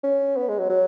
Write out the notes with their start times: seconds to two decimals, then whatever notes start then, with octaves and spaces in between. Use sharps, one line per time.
0.04 C#4
0.37 B3
0.49 G#3
0.59 F#3
0.70 F#3